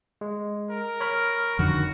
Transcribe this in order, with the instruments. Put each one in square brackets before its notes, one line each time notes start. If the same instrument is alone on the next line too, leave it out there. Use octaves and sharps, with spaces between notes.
[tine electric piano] G#3
[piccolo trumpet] A#4
[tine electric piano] C#5 B5 F6
[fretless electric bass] F2 D3 D#3 [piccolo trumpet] F#4